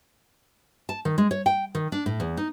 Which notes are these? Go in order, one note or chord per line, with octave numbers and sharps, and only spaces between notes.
A5
D#3
G#3
C#5
G5
D#3
D4
A2
E2
D#4